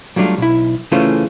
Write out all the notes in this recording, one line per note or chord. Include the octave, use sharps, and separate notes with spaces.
F#3 G3 A3 D4 F4
B1 E4
C#3 E3 A3 C#4 F4 C5